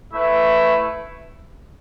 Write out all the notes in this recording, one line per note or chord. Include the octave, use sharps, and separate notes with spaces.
A3 E4 B4